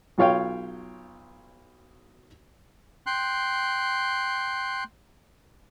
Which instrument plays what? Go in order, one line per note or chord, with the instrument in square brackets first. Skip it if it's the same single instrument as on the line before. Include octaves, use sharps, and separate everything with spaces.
[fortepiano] B1 F4 C#5 F5 G5
[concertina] G5 C6 F#6